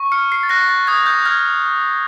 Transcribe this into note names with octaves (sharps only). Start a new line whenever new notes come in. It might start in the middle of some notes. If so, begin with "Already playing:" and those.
Already playing: C#6
F6 C#7
C7
A6
F#6 A#6
A6
D#6 G#6
G6
F6 G#6